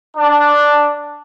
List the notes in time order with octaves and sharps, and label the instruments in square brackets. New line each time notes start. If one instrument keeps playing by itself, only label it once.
[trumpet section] D4